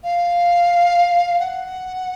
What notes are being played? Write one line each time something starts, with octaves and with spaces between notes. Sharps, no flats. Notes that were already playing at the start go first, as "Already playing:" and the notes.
F5
F#5